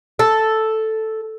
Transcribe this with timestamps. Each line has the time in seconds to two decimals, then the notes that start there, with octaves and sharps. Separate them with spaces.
0.19 A4